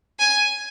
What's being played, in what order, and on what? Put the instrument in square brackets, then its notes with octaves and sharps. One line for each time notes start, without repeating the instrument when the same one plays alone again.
[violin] G#5